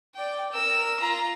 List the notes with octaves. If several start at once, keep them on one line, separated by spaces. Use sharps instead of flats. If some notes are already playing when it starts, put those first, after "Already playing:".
D5 G5
A#4 E6
F4 A#5